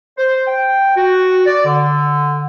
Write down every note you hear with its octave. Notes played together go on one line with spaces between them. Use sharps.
C5
G5
F#4
D5
D3